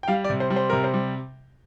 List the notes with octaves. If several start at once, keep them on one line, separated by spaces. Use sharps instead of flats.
G5
G3 F5
D5
C3
C5
G3
C5
C3 A#4
C5
G3